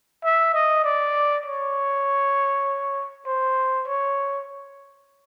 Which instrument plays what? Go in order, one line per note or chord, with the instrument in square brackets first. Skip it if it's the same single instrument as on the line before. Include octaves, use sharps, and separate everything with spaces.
[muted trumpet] E5
D#5
D5
C#5
C5
C#5